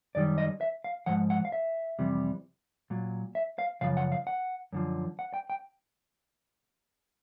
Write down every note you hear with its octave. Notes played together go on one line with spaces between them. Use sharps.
F#2 D#3 G3 D5
D#5
E5
F5
G#2 F3 F#5
F#5
F5
E5
F2 C3 E3 G3
A#2 F#3
E5
F5
F#2 C#3 F3 F5
F#5
F5
F#5
F#2 D3 F3
F#5
G5
G5